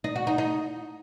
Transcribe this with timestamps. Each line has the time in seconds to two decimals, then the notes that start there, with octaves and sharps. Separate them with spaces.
0.04 D#4
0.16 F#4
0.27 D#4
0.38 D#4